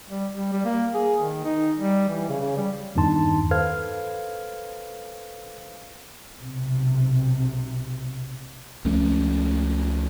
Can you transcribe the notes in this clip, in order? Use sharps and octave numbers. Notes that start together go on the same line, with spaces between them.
G3
G3
G3
A#3
G#4
D#3
D#4
G3
E3
C#3
C#3
G3
E2 G2 D#3 D#4 A5 C6
A4 B4 C5 F5 F6 G#6
B1 C3
C#2 F3 A3 C#4